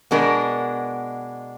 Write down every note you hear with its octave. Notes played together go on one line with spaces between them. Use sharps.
B2 G#3 B3 D4 A#4